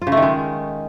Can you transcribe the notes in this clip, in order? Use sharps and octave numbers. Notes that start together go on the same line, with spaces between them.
F4
C#3
A3
D#3
G#3